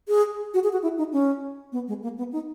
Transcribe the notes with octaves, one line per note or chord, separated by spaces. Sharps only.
G#4
F#4
G#4
F#4
E4
D#4
C#4
B3
G#3
A#3
B3
D#4